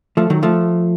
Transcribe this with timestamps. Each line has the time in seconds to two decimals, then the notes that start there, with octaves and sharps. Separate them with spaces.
0.17 F3 A3
0.30 D#3 F#3
0.43 F3 A3